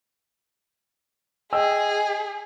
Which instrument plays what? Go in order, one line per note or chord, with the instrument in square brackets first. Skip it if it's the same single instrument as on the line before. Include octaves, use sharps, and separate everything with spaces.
[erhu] G#4 [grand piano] D#5 G5 E6